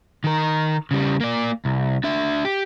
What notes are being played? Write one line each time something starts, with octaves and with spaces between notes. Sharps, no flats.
D#3 A#4
C#3 G3
A#3 D5
C2
D4 E5
G4